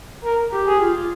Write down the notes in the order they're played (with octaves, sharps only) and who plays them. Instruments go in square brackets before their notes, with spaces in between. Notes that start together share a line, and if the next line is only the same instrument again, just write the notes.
[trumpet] A#4
[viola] G4
[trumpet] G#4
[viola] F4